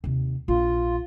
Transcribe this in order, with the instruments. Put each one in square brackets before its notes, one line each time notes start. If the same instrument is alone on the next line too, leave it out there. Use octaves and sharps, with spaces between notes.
[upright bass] D#2 C3
[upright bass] A#1 [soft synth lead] F4